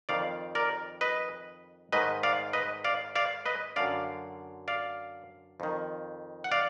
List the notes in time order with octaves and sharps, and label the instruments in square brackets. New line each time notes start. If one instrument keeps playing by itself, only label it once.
[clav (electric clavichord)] F2 D#3 D5 F5
A#4 D5
B4 D#5
G#2 D#3 B4 D#5
D5 F5
B4 D#5
D5 F5
D5 F5
B4 D#5
F#2 D3 D5 F5
D5 F5
F2 D#3
F#5
D5 F5